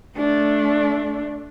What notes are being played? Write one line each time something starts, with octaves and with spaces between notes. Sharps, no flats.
A3 D4